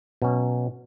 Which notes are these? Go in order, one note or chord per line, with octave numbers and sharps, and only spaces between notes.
B2 F#3 C#4